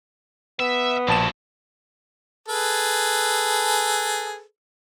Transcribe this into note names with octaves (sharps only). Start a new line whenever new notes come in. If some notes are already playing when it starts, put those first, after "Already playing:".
B3 E5
A#1 G2 B2 A5 E7
G#4 A4 B4